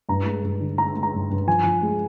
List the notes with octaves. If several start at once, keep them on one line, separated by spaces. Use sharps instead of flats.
G2 A#5
G#3
G2
D3
G#3 A#5
G#3
A#5
G2
G2
F3 G#5
F3
G#3